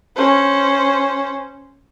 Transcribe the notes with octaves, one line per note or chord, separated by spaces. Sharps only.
C#4 C5